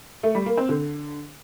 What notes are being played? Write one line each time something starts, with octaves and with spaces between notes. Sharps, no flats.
A3
G3
A#3
C4
D3